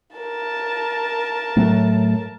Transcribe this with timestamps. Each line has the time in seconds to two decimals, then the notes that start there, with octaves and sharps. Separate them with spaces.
0.16 A#4 A5
1.57 A2 F#3 A3